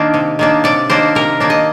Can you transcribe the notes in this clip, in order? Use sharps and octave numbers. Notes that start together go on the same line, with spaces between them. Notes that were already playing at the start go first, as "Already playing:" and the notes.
Already playing: D#3 A#3 D4
C3
D#3 A#3 D4
C3 D5
D#3 A#3 D4 C5
C3 A#4
D#3 A#3 D4
D#5